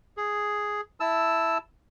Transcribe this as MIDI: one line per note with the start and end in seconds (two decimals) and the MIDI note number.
0.17 0.81 68
1.00 1.58 64
1.00 1.58 81
1.00 1.58 88